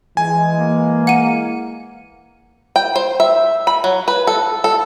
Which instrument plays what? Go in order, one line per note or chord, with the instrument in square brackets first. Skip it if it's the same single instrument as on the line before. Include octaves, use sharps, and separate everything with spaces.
[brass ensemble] E3 G#3 [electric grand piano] G#5
[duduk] A#3
[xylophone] F#5 D#7
[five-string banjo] G5
C5
E5
B5
F#3
B4
A4
A4